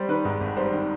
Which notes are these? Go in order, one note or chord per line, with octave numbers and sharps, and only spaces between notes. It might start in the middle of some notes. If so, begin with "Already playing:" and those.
Already playing: G3 C5
D#3 B4
G#2
G#1
G3 C5
D#3